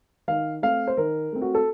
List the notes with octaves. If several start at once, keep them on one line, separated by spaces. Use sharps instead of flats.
D#3 F5
A3 C4 F5
C5
D#3 A#4
A3 C4
F#4
A4